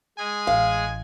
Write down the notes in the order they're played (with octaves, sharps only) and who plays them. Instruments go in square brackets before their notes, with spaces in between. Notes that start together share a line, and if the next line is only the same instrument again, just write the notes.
[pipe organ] G#3 G#4 [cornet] G#5
[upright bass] A1 [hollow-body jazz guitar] F5